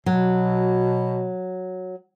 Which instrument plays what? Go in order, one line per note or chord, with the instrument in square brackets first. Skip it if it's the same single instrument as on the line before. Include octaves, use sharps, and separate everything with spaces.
[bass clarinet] B2 [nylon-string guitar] F#3